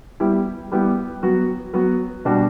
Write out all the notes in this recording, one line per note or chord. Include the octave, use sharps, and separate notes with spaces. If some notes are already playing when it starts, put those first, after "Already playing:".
G3 B3 E4 G4
G3 B3 E4 G4
F#3 B3 F#4
F#3 B3 F#4
B2 G3 D4 F#4